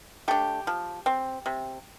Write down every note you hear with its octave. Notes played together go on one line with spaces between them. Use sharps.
A3 D4 G4
F3
C4
C3